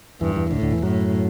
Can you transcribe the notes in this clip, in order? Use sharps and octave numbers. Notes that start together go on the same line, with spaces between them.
E2 G2 E3
E2 E3
D2 A2 D3
D2 D3
E2 E3
F#2 A2 F#3